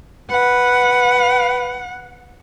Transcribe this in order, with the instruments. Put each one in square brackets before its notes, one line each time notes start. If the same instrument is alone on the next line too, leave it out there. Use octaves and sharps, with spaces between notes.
[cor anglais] B4 [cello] F#5